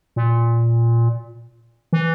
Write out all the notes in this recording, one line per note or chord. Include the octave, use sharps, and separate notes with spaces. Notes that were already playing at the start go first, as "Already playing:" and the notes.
A#2
E3